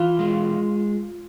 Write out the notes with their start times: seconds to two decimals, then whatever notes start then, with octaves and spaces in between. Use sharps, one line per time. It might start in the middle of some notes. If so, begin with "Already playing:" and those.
Already playing: E3 F4
0.19 G#3